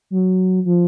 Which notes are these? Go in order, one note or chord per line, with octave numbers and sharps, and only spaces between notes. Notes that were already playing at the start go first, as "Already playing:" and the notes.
F#3
F3